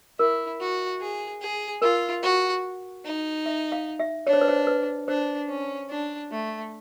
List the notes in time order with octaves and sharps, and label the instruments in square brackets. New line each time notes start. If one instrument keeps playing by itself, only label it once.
[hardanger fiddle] E4 [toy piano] A#4
[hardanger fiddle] F#4
G#4
G#4
[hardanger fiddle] F4 [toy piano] A#4
[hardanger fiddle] F#4
D#4
[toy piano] E5
F5
E5
[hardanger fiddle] D4 [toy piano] C#5
[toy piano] C5
B4
C5
B4
[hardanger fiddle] D4 [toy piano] C5
[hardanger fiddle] C#4
D4
A3